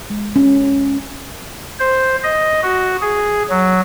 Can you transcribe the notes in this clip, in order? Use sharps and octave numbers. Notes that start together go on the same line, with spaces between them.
G#3
C#4
C5
D#5
F#4
G#4
F#3